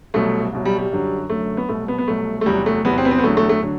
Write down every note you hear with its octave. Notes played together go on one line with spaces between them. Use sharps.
C2 B2 F#3 A3
C2 B2 F#3
G3
G3
F#2 D3 F#3
F#2 D3 F#3 A3
B3
C2 B2 F#3 A3
B3
B3
C2 B2 F#3 A3
A3
E2 C3 F#3 G3
A3
E2 C3 F#3 B3
C4
B3
C4
B3
E2 D3 F#3 A3
A3
A3
D3 F#3